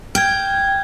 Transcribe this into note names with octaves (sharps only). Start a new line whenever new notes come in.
G5 F6 G6 G#6